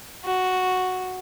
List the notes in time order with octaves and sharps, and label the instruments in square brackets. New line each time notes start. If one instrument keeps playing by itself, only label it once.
[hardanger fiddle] F#4